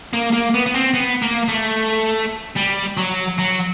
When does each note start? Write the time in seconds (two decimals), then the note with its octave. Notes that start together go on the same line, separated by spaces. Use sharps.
0.13 A#3
0.33 A#3
0.54 B3
0.66 B3
0.74 C4
0.94 B3
1.22 A#3
1.48 A3
2.57 G3
2.97 F#3
3.38 F#3